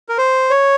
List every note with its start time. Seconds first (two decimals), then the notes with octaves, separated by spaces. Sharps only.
0.09 A#4
0.18 C5
0.50 C#5